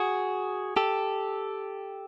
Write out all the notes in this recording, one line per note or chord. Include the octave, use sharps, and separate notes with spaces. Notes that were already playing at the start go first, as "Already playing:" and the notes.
Already playing: F#4 G#4
G4 A4